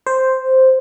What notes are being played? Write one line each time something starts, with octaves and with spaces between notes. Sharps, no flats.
C5